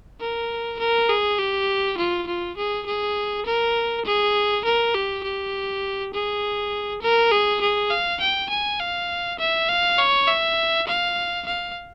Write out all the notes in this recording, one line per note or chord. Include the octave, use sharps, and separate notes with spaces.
A#4
A#4
G#4
G4
F4
F4
G#4
G#4
A#4
G#4
A#4
G4
G4
G#4
A#4
G#4
G#4
F5
G5
G#5
F5
E5
F5
C#5
E5
F5
F5